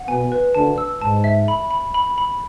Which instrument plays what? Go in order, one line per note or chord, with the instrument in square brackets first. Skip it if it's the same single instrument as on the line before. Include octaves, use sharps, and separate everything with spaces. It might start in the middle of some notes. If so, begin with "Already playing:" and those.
Already playing: [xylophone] F#5
[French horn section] B2 B3 [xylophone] G#5
[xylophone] B4
[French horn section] D2 D3 [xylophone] A5
[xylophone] E6
[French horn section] G#2 [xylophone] A5
[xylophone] E5
B5
B5
B5
B5